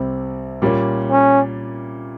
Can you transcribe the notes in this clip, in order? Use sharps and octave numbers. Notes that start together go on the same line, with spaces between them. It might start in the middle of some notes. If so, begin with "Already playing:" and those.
Already playing: C2 C3 G3 C4
A#2 G3 A#3 C#4
C#4